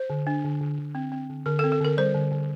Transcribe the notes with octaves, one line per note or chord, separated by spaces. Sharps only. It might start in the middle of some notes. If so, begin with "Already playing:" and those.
Already playing: C5
D3
D4
D3
D3
D3
C4
C4
D3
D3 A#4
A4
C4
A4
D3 A#4
G3 C5
D3
D3